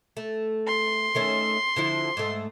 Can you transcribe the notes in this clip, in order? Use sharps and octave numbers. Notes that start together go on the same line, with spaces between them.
A3
C6
D#3 A3 C#4
D3 F3 E4
G#2 A3